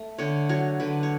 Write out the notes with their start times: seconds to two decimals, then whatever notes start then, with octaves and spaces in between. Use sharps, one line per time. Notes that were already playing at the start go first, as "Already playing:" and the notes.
Already playing: A3
0.18 D3 C#5
0.49 F#3 C#5
0.80 D3 B4
1.03 C#5